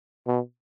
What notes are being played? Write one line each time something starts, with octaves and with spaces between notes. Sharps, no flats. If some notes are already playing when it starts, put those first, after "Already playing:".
B2